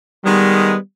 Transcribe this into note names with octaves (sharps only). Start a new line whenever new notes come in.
D#3 G3 G#3 B3